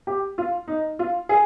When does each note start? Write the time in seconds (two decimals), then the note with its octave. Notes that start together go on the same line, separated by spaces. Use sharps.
0.07 G4
0.38 F4
0.68 D#4
0.99 F4
1.29 G#4